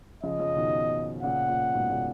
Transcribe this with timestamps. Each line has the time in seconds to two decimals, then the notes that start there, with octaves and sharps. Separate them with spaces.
0.23 C#3 F3 D#5
0.40 C#3 F3
0.56 B2 D#3
1.23 A#2 C#3 F#5
1.48 A#2
1.73 G#2 B2
1.90 A#2 C#3